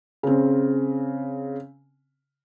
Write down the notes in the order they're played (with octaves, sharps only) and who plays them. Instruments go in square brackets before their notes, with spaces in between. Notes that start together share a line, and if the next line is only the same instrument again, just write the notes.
[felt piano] C#3 C4